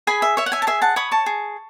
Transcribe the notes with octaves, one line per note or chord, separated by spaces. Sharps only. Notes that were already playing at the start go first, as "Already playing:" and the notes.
G#4 G#5 B5
E5
C#5 E5
F#5
E5 G#5
A5
G#4 E5 G#5
F#5 A5
C#5 B5 D#6
A5 C#6
G#4